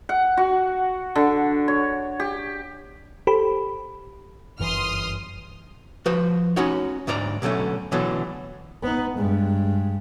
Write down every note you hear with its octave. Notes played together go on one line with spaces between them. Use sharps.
F#5
F#4
D3
C#5
G4
G4 A4 C5 B5
G1 F#2 E3 C6 D#6 F6
F3 F#4 B4 C5
C#4 D#4 F#4 C#5
D2 G#2 D4 D5 A#5
B2 D3 F#3 A3 C#4
B2 D3 E3 F#3 A3
B3 D#4
G2 G#3